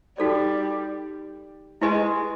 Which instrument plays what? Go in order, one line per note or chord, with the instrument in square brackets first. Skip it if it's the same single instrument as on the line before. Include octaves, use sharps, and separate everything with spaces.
[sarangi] G3 [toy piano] D#4 F#4 A4 D5
[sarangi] G#3 [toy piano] E4 G4 B4 D#5 G#5